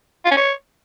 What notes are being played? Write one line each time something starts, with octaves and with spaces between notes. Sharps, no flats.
F4
C#4
C#5